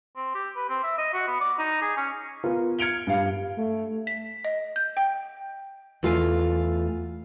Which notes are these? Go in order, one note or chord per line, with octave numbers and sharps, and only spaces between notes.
C4
G4
B4
C4
E5
D#5
F#4
B3
D5
D#4
G#4
C#4
B3 F4 A#4 B4
F6 G#6 C#7 D7 F7 G7
G2 F5
A3
B6
D#5
G6
G5
E2 A3 F4 F5 G5 G#5